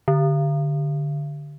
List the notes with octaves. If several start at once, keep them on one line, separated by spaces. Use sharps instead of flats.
D3